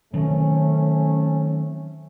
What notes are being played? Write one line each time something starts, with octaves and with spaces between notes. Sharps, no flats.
D#3 F#3 A3 C4 C#4